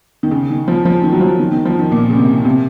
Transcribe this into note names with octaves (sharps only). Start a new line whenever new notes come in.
D#3
C#3
D#3
F3
F3
D#3
F#3
F3
D#3
D#3
F3
D#3
A#2
C#3
C3
C3